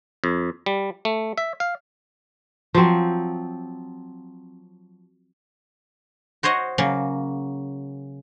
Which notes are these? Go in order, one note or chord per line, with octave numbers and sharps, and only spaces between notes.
F2
G3
A3
E5
F5
F3 F#3 C4
F#4 C5 C#5 D#5 F#5
C#3 F#3 A#3